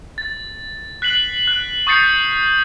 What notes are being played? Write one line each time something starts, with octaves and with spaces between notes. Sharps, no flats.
A6
F#6 B6 C7 F#7
F#6
C#6 D#6 G6 A6 C7 C#7